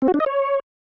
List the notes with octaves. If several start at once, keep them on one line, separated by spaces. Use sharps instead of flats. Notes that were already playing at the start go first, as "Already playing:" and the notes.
C4
F#4
D4
D#5
C#5